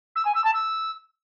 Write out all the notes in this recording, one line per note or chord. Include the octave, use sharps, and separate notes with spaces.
E6
G#5
E6
A5
E6